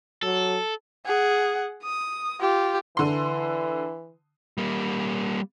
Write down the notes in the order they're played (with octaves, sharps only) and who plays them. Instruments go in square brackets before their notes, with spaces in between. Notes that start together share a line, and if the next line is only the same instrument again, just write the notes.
[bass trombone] F#3 [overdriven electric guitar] A4
[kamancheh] G#4 F#5
D#6
F4 G4
[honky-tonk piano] D3 C6 [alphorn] E3
[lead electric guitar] G3 A#3